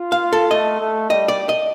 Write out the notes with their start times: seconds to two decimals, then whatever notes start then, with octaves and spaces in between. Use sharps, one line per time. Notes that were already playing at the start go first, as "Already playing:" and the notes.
Already playing: F4
0.12 F5
0.33 A4
0.51 A3 D#5
0.80 A3
1.10 G3 D#5
1.28 D5
1.49 D#5